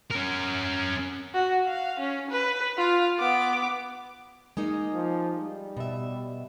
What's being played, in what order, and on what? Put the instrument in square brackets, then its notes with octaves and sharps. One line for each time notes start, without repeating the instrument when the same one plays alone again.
[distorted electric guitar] C#4 A#4
[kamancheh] F#4
F5
C#4
B4
F4 F5
B3 D6
[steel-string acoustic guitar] G#3 A#3 D#4
[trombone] F3
G3
[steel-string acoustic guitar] B2 E5